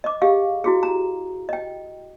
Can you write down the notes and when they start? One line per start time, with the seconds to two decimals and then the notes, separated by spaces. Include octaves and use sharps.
0.04 D#5 D6
0.22 G4 G#4 D#5 F5
0.64 E4 F#4 G#4
0.83 A#5
1.49 D#5 G5